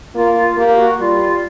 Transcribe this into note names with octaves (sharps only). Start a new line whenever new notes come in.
A#3 F4
F4
A#3 G4
F#4
G3 F4
F4